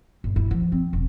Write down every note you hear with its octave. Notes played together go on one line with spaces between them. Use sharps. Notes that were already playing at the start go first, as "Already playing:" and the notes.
G1
E4
F3
C4
E1